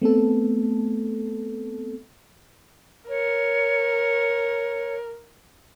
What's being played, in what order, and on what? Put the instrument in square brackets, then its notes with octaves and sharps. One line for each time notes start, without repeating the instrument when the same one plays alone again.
[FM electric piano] A3 B3 C4 A4
[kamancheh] A#4 [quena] C#5